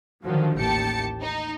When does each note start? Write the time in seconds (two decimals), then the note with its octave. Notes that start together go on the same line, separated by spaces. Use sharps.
0.24 D3 D#3 F3 F#3
0.58 A1 D#2 G4 G5 A5 C#7
1.21 D#4